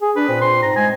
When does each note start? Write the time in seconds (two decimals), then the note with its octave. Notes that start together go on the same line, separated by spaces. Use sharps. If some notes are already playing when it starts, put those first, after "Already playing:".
0.02 G#4
0.16 D4 B4
0.29 A#2 C4
0.42 C6
0.63 G#2 A#5
0.76 G#3 G#5